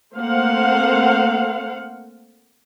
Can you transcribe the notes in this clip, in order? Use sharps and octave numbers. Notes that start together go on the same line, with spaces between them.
A3 A#3 C4 C5 F5 F#5